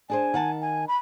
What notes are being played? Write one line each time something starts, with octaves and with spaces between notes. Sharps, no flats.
D4 G#4 C5 G#5
D#3 F#5 A5
G#5
B5